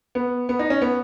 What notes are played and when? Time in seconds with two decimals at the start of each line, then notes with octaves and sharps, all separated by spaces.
0.15 B3
0.49 B3
0.59 D#4
0.70 C#4
0.82 B3